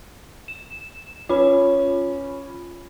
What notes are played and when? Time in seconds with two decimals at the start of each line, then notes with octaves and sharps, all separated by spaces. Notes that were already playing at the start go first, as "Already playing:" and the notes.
0.48 E7
1.29 C#4 F4 B5